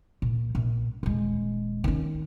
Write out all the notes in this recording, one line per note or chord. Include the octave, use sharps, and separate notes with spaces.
A#2
A#1
D#1 G#3
D#3 C#4